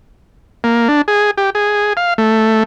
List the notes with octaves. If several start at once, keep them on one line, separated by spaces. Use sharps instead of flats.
A#3
D4
G#4
G4
G#4
F5
A3